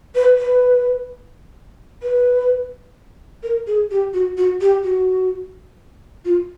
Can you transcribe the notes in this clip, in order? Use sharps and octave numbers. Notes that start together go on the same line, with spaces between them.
B4
B4
B4
A#4
G#4
G4
F#4
F#4
G4
F#4
F4